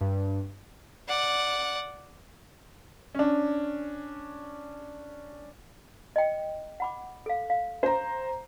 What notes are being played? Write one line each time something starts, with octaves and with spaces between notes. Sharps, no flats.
G2
D5 F#5
C#4 D4
D#5 G5
F#5 B5 D6
A4 F5
F5
C5 A#5